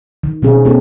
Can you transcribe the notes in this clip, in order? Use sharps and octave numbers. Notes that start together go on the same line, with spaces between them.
D#3
B2 D#3 C4 C#4 G#4
A3 B3 C#4 D#4 G4 A4